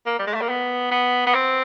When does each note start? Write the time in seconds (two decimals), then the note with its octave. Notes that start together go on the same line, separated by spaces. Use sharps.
0.06 A#3
0.19 G3
0.27 G#3
0.34 A3
0.41 A#3
0.49 B3
0.91 B3
1.26 B3
1.34 C4